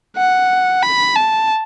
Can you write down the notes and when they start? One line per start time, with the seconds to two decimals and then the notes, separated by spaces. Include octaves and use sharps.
0.17 F#5
0.83 B5
1.16 A5